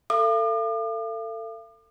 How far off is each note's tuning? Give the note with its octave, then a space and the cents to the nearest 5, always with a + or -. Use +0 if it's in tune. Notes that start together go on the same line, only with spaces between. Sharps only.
A4 +25 F5 -45 D6 +45